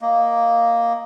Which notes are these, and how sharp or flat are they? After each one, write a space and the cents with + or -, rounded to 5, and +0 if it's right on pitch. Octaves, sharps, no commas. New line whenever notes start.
A#3 +0 D#5 +0